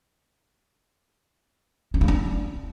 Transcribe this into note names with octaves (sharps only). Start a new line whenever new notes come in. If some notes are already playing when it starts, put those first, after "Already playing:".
C4
A#3
D4